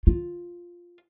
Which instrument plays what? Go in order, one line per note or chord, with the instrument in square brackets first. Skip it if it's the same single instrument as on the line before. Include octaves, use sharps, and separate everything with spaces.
[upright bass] F4